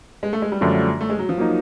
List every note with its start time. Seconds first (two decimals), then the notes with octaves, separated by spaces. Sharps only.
0.23 G#3
0.33 A3
0.42 G#3
0.52 G3
0.61 F#2 D3 F3 A3 D4
1.01 A3
1.10 G#3
1.19 F#3
1.29 F3
1.38 F#3 A#3 D#4